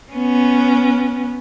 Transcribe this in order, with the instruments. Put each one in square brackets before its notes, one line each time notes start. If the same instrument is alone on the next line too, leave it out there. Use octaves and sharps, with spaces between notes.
[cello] B3 C#4